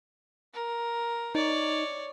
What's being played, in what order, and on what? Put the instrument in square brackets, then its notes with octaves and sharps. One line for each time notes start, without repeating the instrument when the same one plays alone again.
[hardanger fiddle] A#4
[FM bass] D#4 [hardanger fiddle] C#5 D5